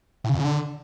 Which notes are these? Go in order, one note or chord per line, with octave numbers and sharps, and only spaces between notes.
A2
C#3
F2
C#3
D3